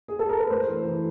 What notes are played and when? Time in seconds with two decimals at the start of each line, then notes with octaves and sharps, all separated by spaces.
0.08 G#4
0.19 A4
0.29 A#4
0.39 B4
0.50 A3 C5
0.68 E3
0.85 E3